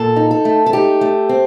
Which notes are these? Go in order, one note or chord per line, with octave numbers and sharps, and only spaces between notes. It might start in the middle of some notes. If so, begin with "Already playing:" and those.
Already playing: A#2 A4
D#4
A4
A3
A4
D#4 G4
A3
C4